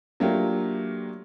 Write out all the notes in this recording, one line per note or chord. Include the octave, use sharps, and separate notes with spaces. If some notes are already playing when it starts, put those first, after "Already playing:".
F#3 A3 A#3 D4 F4 G4